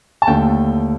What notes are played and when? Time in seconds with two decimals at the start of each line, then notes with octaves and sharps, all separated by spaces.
0.22 A5
0.27 D#2 D3 A3 G5